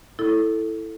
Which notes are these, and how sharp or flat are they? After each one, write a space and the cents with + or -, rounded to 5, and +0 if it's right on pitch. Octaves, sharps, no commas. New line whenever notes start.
E4 +0 A4 +0